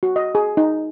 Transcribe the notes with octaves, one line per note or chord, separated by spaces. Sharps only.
F#4
D#5
G#4
D#4